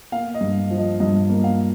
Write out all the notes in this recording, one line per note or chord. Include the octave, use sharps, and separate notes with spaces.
A#3 F5
D#5
G2
F3
D#5
G2 D#5
A#3
F5